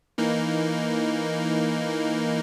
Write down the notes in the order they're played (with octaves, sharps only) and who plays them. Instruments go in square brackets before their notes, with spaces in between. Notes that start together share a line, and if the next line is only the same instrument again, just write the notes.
[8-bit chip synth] E3 A#3 D#4